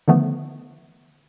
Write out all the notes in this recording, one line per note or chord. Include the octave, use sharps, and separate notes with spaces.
D3 D#3 F3 A3 B3